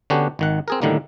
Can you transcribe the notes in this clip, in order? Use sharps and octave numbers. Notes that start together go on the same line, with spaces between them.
D3 B3 C#4 D4 F#4 G4
G#1 D#3 F#5
C4 G#4 A#4
A2 D3 D#3 G3 A#3